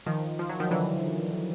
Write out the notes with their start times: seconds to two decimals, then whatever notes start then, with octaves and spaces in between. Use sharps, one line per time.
0.06 D#3 F3
0.39 F3
0.49 F#3
0.60 D#3 F3
0.71 D3 E3